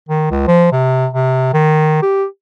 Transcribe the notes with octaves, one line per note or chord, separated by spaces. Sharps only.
D#3
C#2
F3
C3
C3
D#3
G4